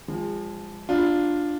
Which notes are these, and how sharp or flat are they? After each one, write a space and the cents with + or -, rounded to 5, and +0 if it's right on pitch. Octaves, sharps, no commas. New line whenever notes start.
F3 +0 G#3 -35
D4 +10 F4 +5